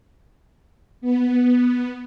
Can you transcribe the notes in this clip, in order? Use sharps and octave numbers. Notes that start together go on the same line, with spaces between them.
B3